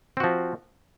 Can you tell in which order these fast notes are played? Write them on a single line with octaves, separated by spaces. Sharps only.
C4 F#4 F3